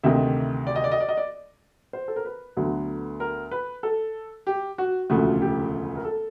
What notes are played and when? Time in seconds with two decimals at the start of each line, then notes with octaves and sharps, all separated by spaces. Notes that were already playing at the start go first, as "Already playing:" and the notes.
0.03 D2 C3 D#3 E5
0.67 D5
0.76 D#5
0.84 D5
0.92 D#5
1.00 D5
1.09 D#5
1.17 D5
1.93 C5
2.08 A4
2.16 A#4
2.25 B4
2.57 D2 D3 F#3 B3
3.20 A#4
3.51 B4
3.83 A4
4.47 G4
4.78 F#4
5.10 E1 D2 C#3 F3 A3 F#4
5.41 G4
5.96 A#4
6.05 A4